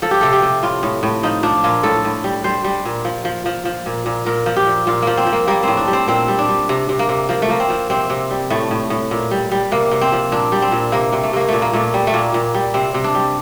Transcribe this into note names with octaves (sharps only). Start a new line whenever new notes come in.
F3 A4
G4
C3 A4
G4
C3
A2 F4
A2
A2
F3 D#4
F3 D4
A#2 F4
A2 A4
A2
G3
G3 C5
G3
A#2
F3
F3
F3
F3
A#2
A#2
A#2 A#4
F3
G4
A#2
A#2 F4
F3 A#3
C4
F3
A#3
G3 A#3
A2 C4
D4
G3
C4
A#2 C4
G3
D4
G3
C3
C3
A#3
C3
F3 A#3
A3
F3 A#3
C4
F3
C3 C4
C3
G3
A2 A3
A2
A2
A#2
G3
G3
C3 A#3
C3
C4
F3
A#2 D4
G3
C4
A#2
C3 A#3
C3
A3
C3 A#3
A#2 A3
A#3
A#2 A3
G3
A3
A#2 A#3
A#2
G3
C3 C4
C3
D4
G3